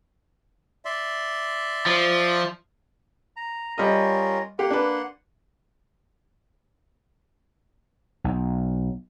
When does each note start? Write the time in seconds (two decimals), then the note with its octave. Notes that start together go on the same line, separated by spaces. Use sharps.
0.85 D5 E5 C6
1.86 F3
3.36 A#5
3.78 G3 C#4 F4 A#4 D#5
4.59 A#3 G4 F#5 C6
4.70 D4 B4
8.24 B1